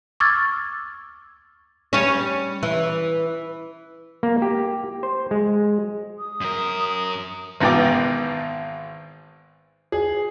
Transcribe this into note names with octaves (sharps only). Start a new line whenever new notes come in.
C#6 D6 E6 F6 G#6 A6
G3 C#4
E3
A#3
G4
C5
G#3
D#6
F#2 A#4
G#1 G#2 B2 E3 G5 D6
G#4